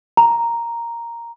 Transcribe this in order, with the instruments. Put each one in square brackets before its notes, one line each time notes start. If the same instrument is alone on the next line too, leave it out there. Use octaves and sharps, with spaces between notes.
[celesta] A#5